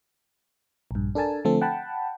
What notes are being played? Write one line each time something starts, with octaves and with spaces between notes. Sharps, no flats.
A#1 G2
D4 A4 A#4 G#5 A5
D3 F3 A3 C4 A4
F#5 G5 A5 B5